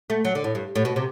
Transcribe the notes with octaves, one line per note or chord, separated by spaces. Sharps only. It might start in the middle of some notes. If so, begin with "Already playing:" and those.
A3
F#3
D3
A2
G2
A2
B2
C3